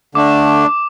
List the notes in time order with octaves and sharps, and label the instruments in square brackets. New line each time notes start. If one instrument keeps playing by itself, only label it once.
[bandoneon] D3 A3 D4 [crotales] D6